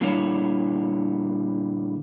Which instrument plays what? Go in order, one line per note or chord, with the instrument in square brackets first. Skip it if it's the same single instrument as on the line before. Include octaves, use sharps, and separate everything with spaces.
[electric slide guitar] A#2 D3 G3 E4 C#5